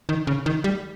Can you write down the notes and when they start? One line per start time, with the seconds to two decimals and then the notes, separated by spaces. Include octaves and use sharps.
0.09 D#3
0.27 C#3
0.46 D#3
0.64 G3